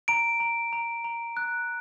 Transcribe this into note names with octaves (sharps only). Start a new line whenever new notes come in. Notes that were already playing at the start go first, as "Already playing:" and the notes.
A#5 D7
A#5
A#5
A#5
F#6